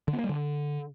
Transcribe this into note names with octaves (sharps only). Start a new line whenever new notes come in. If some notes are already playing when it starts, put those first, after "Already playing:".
D3
B3
A#3
G3
D3